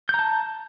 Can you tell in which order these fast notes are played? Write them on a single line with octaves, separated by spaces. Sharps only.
G6 A#5 A5